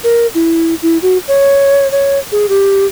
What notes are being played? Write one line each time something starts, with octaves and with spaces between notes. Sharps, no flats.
A#4
E4
E4
F#4
C#5
C#5
G#4
G4